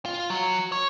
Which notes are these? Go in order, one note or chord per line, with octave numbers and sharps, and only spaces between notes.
F4
F#3
C#5